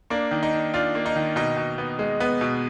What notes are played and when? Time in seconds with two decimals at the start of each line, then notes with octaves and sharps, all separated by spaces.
0.10 A#3 D4
0.31 D#3
0.43 D#4
0.53 D4
0.74 D4 F4
0.95 A#3
1.06 D#4
1.16 D#3
1.36 B2 D#4
1.57 B2
1.78 B3
1.99 G#3
2.20 B3
2.41 B2